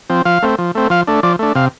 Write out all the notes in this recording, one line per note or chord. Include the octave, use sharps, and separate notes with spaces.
F3 C4
F3 F5
A3 C4
F3
A3 C4
F3 F5
A3 D4
F3 D5
A3 D4
C3 F5